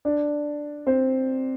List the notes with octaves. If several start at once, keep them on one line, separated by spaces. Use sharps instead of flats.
D4 D5
C4 C5